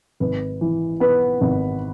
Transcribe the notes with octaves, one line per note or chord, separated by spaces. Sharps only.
G#1 B4
E3
B3 B4
G#1